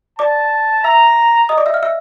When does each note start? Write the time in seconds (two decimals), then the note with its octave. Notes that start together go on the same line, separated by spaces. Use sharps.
0.19 D5 A5 D6
0.84 E5 A#5 E6
1.49 D#5 D#6
1.57 D5 D6
1.66 E5 E6
1.74 F5 F6
1.83 E5 E6